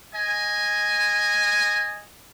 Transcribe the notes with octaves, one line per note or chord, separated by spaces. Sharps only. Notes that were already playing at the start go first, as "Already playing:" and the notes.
D#5 G#5